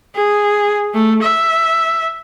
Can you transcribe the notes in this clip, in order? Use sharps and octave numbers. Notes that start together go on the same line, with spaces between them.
G#4
A3
E5